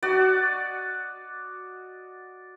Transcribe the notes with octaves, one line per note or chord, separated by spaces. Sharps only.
F#4 D5 D#5